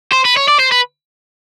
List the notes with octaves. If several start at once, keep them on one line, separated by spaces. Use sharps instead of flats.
C5
B4
C#5
D5
C5
B4